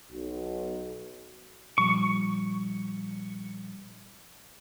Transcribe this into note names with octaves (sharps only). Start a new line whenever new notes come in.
B1
A#2 F3 G3 C#6